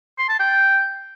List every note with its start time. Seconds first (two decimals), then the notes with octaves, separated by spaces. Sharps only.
0.18 C6
0.29 A5
0.39 G5